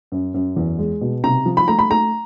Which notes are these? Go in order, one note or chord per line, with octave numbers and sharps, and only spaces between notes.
F#2
F#2
E2
G#3
B2
C3 A#5
F3
B5
A3 A#5
B5
A3 A#5